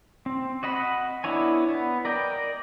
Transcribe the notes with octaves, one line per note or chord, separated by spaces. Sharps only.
C4
F#4 D#5 F#5 B5
B3 D4 E4 C#5 G#5
B3
A#4 D5 D#5 G5